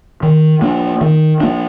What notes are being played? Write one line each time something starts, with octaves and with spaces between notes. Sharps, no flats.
D#3
A#3 D4
D#3
A#3 D4